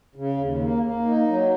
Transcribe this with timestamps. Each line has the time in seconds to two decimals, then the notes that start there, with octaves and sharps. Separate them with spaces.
0.16 C#3
0.37 D#2
0.59 A#3
0.83 A#3
1.06 D#4
1.27 F#3